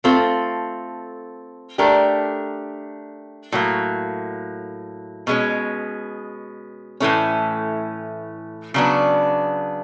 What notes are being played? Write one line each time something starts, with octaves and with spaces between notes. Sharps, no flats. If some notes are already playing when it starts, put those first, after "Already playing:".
A3 C4 F4 A4
A3 D4 G4 A#4
A2 F#3 A#3
B2 G#3 C#4
A2 E3 A3 C#4
C#3 F#3 B3 D4